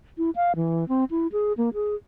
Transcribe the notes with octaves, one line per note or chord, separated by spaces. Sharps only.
E4
F5
E3
C4
E4
G#4
A#3
G#4